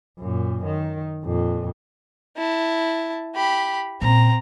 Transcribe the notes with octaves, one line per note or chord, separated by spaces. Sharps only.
F#2 A#2
D#3
F2 A#2
E4 A5
G4 B5
A#2 C#3 C4 A#5